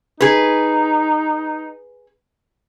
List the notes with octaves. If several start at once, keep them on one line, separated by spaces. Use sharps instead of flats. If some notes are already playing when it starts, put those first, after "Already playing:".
D#4 G#4 B4